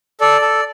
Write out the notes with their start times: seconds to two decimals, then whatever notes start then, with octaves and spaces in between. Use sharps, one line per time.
0.21 A4 D5
0.42 A4